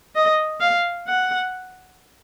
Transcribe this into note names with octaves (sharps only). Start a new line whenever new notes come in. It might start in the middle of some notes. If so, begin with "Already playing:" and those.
D#5
F5
F#5